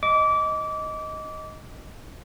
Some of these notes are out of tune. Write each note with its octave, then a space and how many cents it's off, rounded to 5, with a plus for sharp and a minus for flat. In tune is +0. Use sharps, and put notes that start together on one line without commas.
D#5 +5 D6 -25